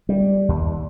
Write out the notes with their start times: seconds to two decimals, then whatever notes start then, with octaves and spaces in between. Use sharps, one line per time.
0.09 G3
0.49 D#2